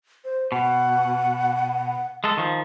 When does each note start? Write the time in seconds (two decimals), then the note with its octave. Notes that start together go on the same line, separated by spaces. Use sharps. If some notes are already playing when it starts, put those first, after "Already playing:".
0.25 C5
0.52 B2 F#5
2.24 G#3 A4
2.37 D#3 F3